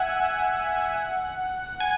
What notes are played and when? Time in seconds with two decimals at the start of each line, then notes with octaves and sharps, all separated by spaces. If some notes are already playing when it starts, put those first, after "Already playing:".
Already playing: E5 F#5 G#5
1.80 G#5